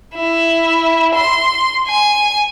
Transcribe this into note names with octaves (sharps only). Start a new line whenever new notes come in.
E4
C6
G#5